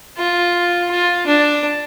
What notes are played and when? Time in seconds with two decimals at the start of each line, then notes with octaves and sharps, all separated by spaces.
0.18 F4
0.91 F4
1.26 D4